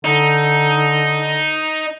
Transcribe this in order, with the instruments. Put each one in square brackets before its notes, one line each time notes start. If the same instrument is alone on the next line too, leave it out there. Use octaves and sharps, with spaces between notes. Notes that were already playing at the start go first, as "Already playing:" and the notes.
[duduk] D3 [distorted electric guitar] D#4